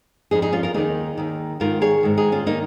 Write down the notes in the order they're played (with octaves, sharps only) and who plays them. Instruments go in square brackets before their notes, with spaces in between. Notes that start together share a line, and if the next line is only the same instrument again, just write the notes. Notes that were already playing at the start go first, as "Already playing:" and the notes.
[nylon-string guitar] F2 D#4 G#4
F3
D#4 G#4
C#4 F4
F4 A#4
D#2 D#3 D#4 G#4
D#2 D#3
G#2 D#3 F4 A#4
G#4 C#5
G#2 D#3
D#4 G#4
C#4 F4
D#3 A#3 D#4